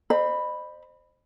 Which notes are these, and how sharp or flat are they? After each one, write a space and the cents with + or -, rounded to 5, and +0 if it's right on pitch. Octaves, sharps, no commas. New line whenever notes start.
C5 +0 D#5 -40 B5 +0